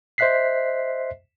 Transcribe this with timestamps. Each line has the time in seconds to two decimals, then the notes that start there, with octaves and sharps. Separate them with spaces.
0.18 C5 D#5 E5 F#6 B6 C7